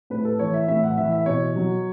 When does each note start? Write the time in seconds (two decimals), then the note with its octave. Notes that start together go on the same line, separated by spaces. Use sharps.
0.10 A2 B4
0.25 A4
0.39 E3 C#5
0.54 E5
0.68 A2 E5
0.84 F#5
0.97 E3 E5
1.11 E5
1.26 B2 C#5
1.56 F#3